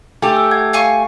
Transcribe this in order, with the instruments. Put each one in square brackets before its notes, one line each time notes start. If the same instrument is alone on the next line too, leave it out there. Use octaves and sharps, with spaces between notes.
[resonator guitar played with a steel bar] A3 G4 [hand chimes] G#5
[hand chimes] E6
F#5 G#6
[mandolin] F5 G#5 C#6